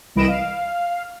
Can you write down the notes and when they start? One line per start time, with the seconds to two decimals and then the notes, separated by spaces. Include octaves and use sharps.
0.15 C2 E3 D#5 B5 D7 E7
0.28 F5